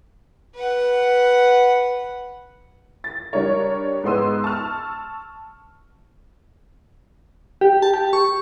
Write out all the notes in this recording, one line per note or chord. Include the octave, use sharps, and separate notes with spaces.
B4 F#5
A6
G3 D4 A#4 C#5
G#2 G#3 B3 C6 E6 D#7
A5 C#6 E6 F6
G4
A5
G4
C#6